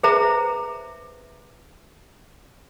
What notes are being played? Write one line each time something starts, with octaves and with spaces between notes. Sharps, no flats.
G#4 B4 C5 E5 A#5